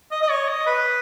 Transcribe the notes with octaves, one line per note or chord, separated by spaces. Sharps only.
D#5
D#5
C#5
D#5
B4